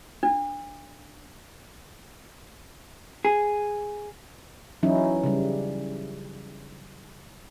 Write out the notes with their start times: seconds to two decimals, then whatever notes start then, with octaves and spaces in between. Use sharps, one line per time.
0.23 D4
3.25 G#4
4.83 E3 F#3 C#4 D#4 E4
5.24 C#3 G3